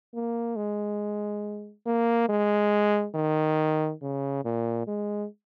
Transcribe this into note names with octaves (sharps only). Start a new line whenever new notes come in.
A#3
G#3
A#3
G#3
D#3
C#3
A#2
G#3